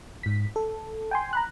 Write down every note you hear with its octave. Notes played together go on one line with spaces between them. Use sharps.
G#2 B6
A4
G5 G#5 C6
A#5 B5 F#6